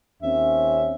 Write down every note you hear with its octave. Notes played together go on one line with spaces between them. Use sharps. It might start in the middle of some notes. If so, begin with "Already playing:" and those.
D#2 C4 C#4 E5